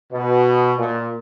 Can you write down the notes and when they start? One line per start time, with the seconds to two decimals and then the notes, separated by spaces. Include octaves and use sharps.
0.12 B2
0.79 A#2